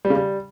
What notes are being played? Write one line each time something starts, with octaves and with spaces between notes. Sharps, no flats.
G3
C#3
G3